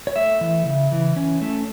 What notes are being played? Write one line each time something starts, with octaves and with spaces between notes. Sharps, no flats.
C#5
A3 E5
E3
C#3
E3
C#4
A3